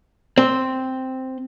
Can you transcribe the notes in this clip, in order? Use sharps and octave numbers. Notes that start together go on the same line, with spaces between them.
C4